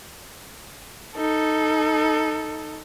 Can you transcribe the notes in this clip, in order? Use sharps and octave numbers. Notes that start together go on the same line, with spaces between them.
D#4 A4